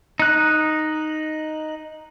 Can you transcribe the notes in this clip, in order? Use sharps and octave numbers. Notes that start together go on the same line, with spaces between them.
D#4 F#6